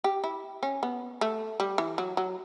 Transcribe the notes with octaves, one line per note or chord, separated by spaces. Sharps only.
G4
E4
C#4
B3
A3
G3
E3
F#3
F#3